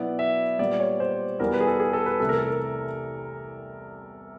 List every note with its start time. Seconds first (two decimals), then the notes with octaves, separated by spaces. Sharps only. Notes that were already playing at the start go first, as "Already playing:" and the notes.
Already playing: B2 F#3 B3 E4 D5
0.19 E5
0.59 A#2 G3 B3 D5
0.80 C#5
1.00 C5
1.39 E2 B2 G3 B3 E4 A#4
1.54 B4
1.60 G#4
1.67 A4
1.80 G#4
1.93 A4
2.06 B4
2.20 C2 C3 E3 A3 A4
2.29 A#4
2.38 A4
2.48 A#4